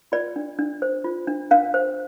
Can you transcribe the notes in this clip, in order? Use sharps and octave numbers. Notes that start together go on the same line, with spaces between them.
F4 D5
D4
D4
C5
F4
D4
D4 F5
C5